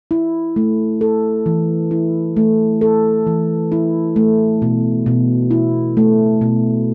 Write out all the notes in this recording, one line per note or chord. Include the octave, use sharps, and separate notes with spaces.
E4
A3
A4
E3
E4
A3
A4
E3
E4
A3
B2
B2
E4
A3
B2